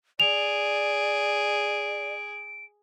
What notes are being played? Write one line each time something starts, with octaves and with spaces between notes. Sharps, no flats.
G#4 D5 D7 F7